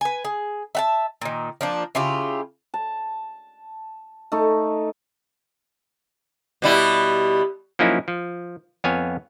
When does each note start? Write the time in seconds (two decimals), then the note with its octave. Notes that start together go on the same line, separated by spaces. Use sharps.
0.01 B4 G#5
0.25 G#4
0.75 E5 F#5 A5
1.21 A#2 D#3
1.61 F3 A#3 D4
1.95 C#3 E4 F4 G4
2.74 A5
4.32 A3 D#4
6.62 B2 G3 E4
7.79 F3 F#3 A#3 C#4 D#4 E4
8.08 F3
8.84 F2 B3 C#5 F5 G#5